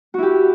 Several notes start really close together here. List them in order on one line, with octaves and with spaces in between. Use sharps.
F#4 E4 G4